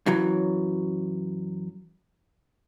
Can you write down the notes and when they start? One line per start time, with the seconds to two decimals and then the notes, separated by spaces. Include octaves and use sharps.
0.06 F#2 E3 F#3